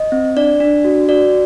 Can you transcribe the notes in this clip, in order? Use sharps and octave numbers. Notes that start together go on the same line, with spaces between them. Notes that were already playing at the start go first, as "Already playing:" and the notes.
Already playing: D#5
C4
D4 D5
D4
F#4
F#4 D5